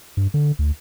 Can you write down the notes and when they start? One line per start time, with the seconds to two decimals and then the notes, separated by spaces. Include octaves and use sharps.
0.17 G2
0.34 D3
0.59 D2